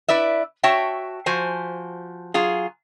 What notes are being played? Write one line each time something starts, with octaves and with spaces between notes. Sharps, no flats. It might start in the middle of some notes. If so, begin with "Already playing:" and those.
E4 B4 D5 E5
F#4 C#5 E5 G5 A5
F3 F#4 C5 G#5
F#3 F4 G#4